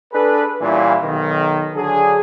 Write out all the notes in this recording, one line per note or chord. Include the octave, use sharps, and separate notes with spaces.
D4 G#4 A4 B4
A#2 E3 G3 C#4 E4 F4
B1 D#3
D3 F#3 D4 G#4